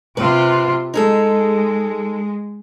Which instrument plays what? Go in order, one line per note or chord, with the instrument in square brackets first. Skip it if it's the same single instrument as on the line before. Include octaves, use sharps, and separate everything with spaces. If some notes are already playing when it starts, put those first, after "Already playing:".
[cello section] C3 F4 [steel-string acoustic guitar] B4
[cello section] G#3 [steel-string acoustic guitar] D#4 G#4 A4